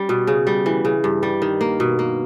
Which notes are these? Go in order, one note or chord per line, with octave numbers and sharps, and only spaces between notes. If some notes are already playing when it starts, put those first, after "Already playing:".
Already playing: G3 C#4
B2
C#3
G3
E3
C#3
G2
G3
D#3
A#3
B2
A#3